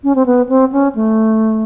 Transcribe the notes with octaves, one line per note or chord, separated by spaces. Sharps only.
C#4
C4
B3
C4
C#4
A3